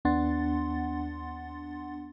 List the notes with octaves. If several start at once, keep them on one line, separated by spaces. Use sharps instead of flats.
D#2 B3 D4 F#5 C6 A6